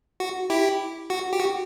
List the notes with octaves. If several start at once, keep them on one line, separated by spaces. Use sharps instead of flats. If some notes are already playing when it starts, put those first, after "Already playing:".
F#4
E4 G4
F#4
G4
F#4